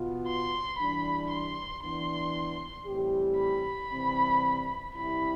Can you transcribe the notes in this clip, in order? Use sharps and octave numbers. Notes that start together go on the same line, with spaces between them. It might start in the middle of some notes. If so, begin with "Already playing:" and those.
Already playing: B2 B3 F4
C6
E3 G3 D4 B5
C6
E3 B3 D4 C6
A2 E3 G3 C4 G4
B5
C3 E3 G3 C4
C3 G3 C4 E4 G4 B5